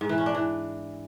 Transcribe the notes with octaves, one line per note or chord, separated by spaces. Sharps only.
G#2
E3
C#4
D4
E3